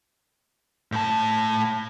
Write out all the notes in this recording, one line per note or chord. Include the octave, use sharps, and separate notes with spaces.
A2 A5